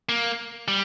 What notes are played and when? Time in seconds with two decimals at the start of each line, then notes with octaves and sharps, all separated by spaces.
0.09 A#3
0.68 G3